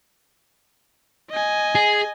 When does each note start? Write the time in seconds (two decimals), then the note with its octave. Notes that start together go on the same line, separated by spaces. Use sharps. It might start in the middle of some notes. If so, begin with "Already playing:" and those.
1.30 D#5 G#5
1.75 G#4